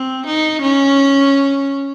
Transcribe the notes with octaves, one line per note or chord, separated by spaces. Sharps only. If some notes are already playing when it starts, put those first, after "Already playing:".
Already playing: C4
D#4
C#4